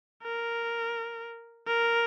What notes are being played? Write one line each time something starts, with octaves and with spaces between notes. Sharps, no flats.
A#4
A#4